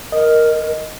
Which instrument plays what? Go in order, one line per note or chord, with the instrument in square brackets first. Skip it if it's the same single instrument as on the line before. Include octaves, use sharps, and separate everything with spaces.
[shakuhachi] A#4 [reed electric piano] D#5